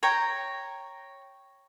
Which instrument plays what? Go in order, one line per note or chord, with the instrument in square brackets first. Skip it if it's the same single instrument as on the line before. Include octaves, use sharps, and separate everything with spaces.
[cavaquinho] C#5 G5 A#5